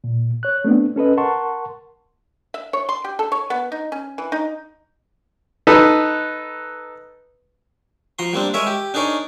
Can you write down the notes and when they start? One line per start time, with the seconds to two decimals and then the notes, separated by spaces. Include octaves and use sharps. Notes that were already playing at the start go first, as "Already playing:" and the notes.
0.04 A#2
0.43 C#5 F#6
0.64 A3 B3 C4 D4
0.96 C#4 A4 B4 D#5
1.17 A#4 F#5 A5 C6 C#6
2.54 E5
2.73 C#5
2.89 C6
3.04 G4
3.19 A4
3.32 C#5
3.50 B3
3.72 D#4
3.92 C#4
4.18 E3
4.32 D#4
5.67 D#4 A4 B4
8.19 F3 A#5 C6
8.33 G3 A#3 C4 D4
8.54 G#3 A#4 C#5 E5
8.67 G4
8.94 D4 D#4 G#4 A#4 C#5